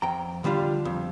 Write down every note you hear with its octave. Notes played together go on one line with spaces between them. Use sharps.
F2 G5 A#5
D3 G3 D4 F4
F2